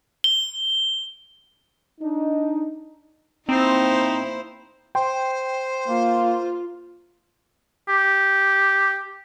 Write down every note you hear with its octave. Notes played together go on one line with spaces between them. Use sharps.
G7
D4 D#4
A#3 C4 D#4 E4 C5
C5 G5 C6
A#3 F4
G4